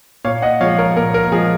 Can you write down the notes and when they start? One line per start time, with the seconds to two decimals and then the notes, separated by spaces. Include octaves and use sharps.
0.25 A#2 C#5 F5
0.42 D#5 F#5
0.61 F3 C#5 F5
0.65 G#3
0.78 A#4 C#5
0.97 A#2 A#4
1.14 A#4
1.32 F3 G#3 G#4